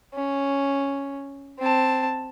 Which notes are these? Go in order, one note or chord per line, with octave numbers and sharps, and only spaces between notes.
C#4
C4 A5